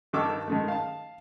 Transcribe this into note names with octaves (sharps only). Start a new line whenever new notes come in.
G2 D#3 A4 C#6 D6 E6
D#3 G#3 A3
F5 A5